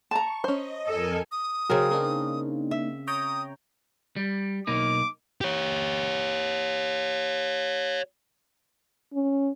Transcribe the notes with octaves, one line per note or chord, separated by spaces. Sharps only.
A5 A#5 C#6
C#4 C5 D#5
F2 A4 A#4 G#5
D#6
C#3 F#3 C4 A#4
A#3 D4 D#4
E5
C#5 G5 A#5 D#6
G3
B1 A#3 D#4 D6
G4 C#5
C#4